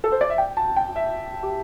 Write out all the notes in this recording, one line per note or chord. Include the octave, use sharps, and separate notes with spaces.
A4
C5
D5
E5
G5
A5
G5
E5
G4